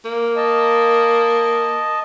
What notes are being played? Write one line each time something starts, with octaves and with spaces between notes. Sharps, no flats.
A#3
D#5 A5